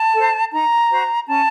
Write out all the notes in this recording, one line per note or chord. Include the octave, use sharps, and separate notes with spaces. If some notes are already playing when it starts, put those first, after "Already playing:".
Already playing: A5
A4 C5
D#4 A#5
F#4 C5
C#4 A5